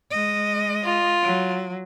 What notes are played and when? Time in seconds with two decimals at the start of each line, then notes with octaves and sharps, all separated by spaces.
0.11 G#3 D#5
0.83 F4
1.22 F#3